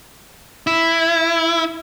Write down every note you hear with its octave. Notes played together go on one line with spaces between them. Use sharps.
E4